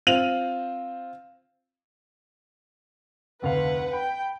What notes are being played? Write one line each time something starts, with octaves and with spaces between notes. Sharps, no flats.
C4 F4 D#7 F7 F#7
F1 D2 B4 F5 F#5
G5 B5